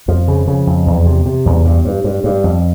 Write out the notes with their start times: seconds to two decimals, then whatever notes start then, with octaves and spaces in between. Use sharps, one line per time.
0.08 F2 F3
0.28 C#3
0.48 C#3
0.67 F2
0.87 E2
1.06 C3
1.26 C3
1.46 E2
1.65 G2
1.85 G2
2.04 G2
2.24 G2
2.44 F2